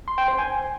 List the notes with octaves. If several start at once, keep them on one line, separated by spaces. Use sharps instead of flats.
C6
G5
C5
G#5